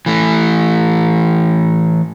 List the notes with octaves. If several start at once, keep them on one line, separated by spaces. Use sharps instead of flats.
E3 A3